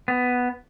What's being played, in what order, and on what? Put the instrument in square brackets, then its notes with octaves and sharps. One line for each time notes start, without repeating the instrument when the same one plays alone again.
[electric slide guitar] B3